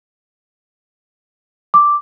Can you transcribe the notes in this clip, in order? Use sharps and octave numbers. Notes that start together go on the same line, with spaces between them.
D6